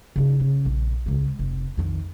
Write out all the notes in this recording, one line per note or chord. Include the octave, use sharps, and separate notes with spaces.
C#3 D#4
C#3
A#1
C#2 G#3
F1
F2 D#3